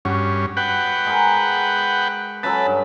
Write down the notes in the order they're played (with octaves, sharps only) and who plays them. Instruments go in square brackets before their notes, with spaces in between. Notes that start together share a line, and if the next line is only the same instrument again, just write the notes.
[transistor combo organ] G2 C#4 [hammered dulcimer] F#4
[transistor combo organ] B4 F#5 G5
[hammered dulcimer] G#3 A#4
[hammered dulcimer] C#3 F#3 A4 [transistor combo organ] B4 A5
[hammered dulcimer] G2